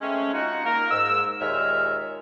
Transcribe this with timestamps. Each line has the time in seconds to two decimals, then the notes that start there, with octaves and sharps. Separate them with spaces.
0.02 G#3 A3 C4 C#4
0.33 D#4 F4 F#4
0.65 A#3 A#4
0.91 G#2 E6
1.40 D#2 A#2 G#3 C#5 E5 F6